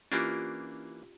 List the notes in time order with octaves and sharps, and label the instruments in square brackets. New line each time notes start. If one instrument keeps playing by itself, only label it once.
[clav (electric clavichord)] E3 A#3 D4 [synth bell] C#4 F4 G4